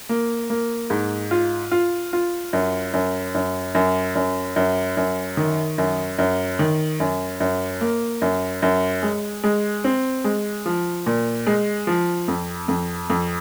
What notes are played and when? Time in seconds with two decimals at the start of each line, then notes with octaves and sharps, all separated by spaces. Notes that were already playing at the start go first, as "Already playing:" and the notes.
0.09 A#3
0.50 A#3
0.90 G#2
1.31 F4
1.71 F4
2.13 F4
2.53 F#2
2.94 F#2
3.35 F#2
3.75 F#2
4.15 F#2
4.56 F#2
4.97 F#2
5.37 D#3
5.78 F#2
6.18 F#2
6.59 D#3
7.00 F#2
7.40 F#2
7.81 A#3
8.22 F#2
8.62 F#2
9.03 G#3
9.44 G#3
9.84 C4
10.24 G#3
10.66 F3
11.06 A#2
11.47 G#3
11.87 F3
12.28 F2
12.68 F2
13.10 F2